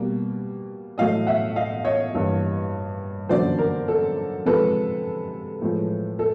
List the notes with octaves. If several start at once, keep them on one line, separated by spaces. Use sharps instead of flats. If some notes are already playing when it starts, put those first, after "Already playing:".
Already playing: B2 G3 A#3
A2 F#3 A3 D#5 F5
E5 F#5
D#5 F5
C#5 D#5
G2 E3 G3 A#3
F#2 D3 F#3 A#3 C5 D5
A#4
A4
C3 F3 G#3 A4 B4
A2 F3 G#3
A4